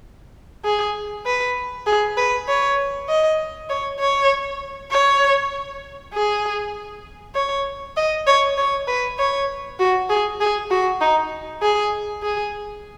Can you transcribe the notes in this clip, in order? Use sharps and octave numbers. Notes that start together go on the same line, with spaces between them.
G#4
B4
G#4
B4
C#5
D#5
C#5
C#5
C#5
G#4
C#5
D#5
C#5
C#5
B4
C#5
F#4
G#4
G#4
F#4
D#4
G#4
G#4